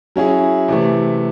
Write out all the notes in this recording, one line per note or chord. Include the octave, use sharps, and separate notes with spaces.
F#3 C#4 E4 G#4
C3 E3 A3